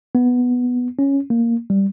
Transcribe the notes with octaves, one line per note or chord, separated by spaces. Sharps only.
B3
C#4
A#3
G3